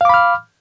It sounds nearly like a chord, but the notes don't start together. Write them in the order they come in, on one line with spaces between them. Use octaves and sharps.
F5 D6 B5 F6